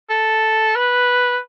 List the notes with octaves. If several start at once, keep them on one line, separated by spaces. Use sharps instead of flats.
A4
B4